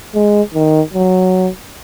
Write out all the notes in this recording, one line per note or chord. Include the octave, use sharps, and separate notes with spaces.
G#3
D#3
F#3